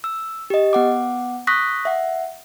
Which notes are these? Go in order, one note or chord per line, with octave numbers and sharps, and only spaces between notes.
E6
G4 D#5
B3 F#5 D6
C#6 D#6 F#6 A#6 B6
E5 F#5